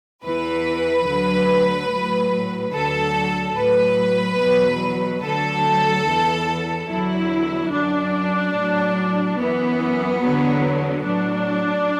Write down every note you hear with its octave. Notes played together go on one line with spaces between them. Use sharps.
E2 E3 B4
D2 D3 F#3
A2 F#3
D2 D3 F#3 A4
A2 F#3 B4
E2 B2 F#3
D2 D3 F#3 A4
E2 E3
E2 D3 F#3 E4
F#2 F#3 D4
A2 F#3
F#2 E3 B3
E2 D3 F#3
A2 F#3 D4